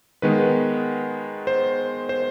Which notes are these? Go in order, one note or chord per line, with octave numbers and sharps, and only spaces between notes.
D#3 G#3 B3 B4
C5
C5